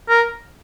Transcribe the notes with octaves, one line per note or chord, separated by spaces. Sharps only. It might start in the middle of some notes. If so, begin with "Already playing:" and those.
A#4